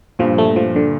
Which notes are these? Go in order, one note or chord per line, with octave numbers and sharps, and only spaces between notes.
G2 A#2 F3
A3
F3
D3